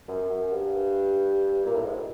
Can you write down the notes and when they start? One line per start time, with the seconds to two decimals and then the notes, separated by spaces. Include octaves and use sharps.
0.08 F#2
0.30 F#2
0.52 G2
1.66 A#2
1.75 A2
1.84 G#2